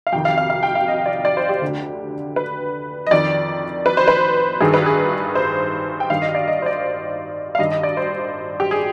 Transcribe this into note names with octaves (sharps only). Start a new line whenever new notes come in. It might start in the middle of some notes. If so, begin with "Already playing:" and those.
F5
F2 C3 D#3 G5
F5
F5
F5
G5
F5
D#5
D5
D5
C5
G4
D2 D3
B4
D#5
F2 D#3 D5
B4
C5
B4
G2 D#3 G#4
B4
G#4
C5
G5
G2 D#3 F5
D#5
D5
D#5
C5
D5
F5
G2 D#3 D#5
D#5
D5
C5
G4
G#4